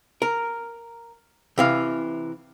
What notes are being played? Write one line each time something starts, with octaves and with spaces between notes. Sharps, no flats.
A#4
C3 E3 F5